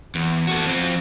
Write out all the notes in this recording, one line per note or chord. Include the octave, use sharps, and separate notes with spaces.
E2
F#4 A4
F3 C4